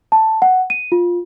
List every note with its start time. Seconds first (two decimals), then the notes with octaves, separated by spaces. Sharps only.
0.12 A5
0.42 F#5
0.70 D#7
0.92 F4